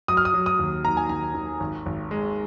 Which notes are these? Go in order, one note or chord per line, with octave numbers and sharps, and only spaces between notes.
F#3 D#6
F6
D#6
F#3
D#6
D#2
D#3 A#5
G#5
D#3 A#5
D#3
G#1
G#1
G#3